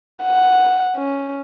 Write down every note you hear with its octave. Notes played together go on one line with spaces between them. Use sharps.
F#5
C#4